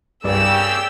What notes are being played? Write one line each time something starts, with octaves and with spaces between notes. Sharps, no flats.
C2 G2 C#3 G4 A#4 D5 E6